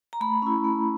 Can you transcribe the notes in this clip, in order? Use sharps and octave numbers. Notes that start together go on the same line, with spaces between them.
A#5
A3 B5
C#4 E4
A3